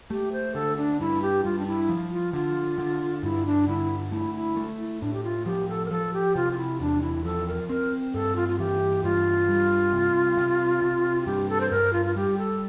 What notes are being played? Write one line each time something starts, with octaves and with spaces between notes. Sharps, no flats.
A3 G4
C5
D3 A4
D4
G2 E4
G4
G2 F4
D4
E4
F3
F4
D3 F4
D3
G2 E4
D4
D3 E4
A3 E4
E4
A3
E4
A2 D4
G4
F4
F3 G4
A4
A#4
F3 A4
G4
C3 F4
F4
E4
E2 D4
E4
F3 A4
A#4
C4 A#4
G2 A4
F4
F4
E3 G4
G2 F4
G3
C3
C3
C3
F4
G2 G4
A4
C5
G2 A#4
F4
F4
G3 G4
A4